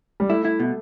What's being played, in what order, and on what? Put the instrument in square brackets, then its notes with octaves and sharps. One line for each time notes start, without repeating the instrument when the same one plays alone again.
[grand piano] G3
[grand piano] A3 [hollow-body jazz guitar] E4
[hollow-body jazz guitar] E4
B2